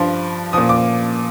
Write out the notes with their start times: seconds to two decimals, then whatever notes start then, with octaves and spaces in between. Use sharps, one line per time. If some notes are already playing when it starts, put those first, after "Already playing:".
Already playing: G2 F3 C6
0.53 A#2 F3 D#6
0.69 D6